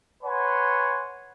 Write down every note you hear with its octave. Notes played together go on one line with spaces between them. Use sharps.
B4 C#5 F#5 G#5 C6